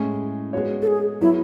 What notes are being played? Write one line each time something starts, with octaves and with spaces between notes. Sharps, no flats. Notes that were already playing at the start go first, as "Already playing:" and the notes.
Already playing: A2 G#3 C#4
G#3 B3 F#4 C#5
A4
G#4
F#3 B3 E4 F#4 C#5